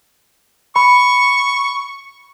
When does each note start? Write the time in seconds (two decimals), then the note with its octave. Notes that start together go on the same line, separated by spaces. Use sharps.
0.76 B5 C#6